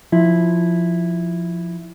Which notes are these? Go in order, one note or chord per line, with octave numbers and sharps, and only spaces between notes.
F3 E4